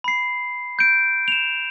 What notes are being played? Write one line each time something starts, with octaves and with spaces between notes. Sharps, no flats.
B5 C7
G6 D7
E7 F7